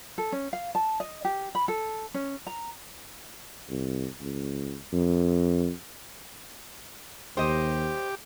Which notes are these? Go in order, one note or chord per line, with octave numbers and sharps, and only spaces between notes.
A4
C#4
F5
A5
D#5
G4
B5
A4
C#4
A#5
C2
C#2
F2
D#2 G4 C5 D#5